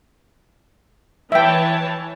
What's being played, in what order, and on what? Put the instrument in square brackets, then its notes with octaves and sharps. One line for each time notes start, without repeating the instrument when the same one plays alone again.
[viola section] E3 C#5 A5 [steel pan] E5 G5